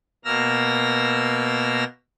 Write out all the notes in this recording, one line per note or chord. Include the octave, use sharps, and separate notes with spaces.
B2 A#3 E6 F6 A#6